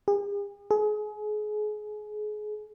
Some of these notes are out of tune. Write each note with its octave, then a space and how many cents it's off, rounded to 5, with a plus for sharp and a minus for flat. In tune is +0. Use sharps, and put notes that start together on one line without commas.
G#4 -45
G#4 +30